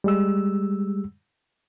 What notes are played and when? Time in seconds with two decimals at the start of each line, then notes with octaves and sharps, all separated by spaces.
0.04 G3 G#3 E6